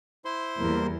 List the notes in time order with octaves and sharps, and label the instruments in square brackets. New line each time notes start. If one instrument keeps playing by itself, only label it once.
[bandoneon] E4 C5 C6
[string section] E2 [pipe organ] G3 A#3 A#4